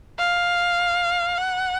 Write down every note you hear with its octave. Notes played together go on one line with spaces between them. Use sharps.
F5
F#5